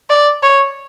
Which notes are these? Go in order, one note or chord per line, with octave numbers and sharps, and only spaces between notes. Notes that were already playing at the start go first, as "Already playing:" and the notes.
D5
C#5